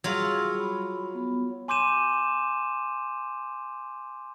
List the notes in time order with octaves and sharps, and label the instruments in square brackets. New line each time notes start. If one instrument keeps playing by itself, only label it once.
[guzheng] F#3 F4 [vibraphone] G3 G#4 E6
[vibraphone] B5
B3 B5
[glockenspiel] G#5 C6 D6 G6 D#7 E7